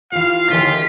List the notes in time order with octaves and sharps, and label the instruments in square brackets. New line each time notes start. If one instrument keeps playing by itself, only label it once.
[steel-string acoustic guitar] E3 G4 [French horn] F4 [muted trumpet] F5
[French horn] D#2 [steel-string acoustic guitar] D3 E3 [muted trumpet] F4 [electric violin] B6